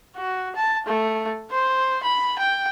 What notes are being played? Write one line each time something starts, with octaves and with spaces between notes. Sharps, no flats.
F#4
A5
A3
C5
B5
G5